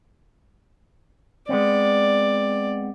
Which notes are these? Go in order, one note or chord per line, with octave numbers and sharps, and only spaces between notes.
G#3 B3 C4 D5